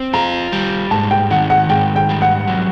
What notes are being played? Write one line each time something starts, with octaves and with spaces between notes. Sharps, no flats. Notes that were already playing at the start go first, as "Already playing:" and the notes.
Already playing: C4
F4 A#5
G3
G#2 A5
G5
D#3 F#5
F#5
G#2 G5
G5
G3
F#5
F#3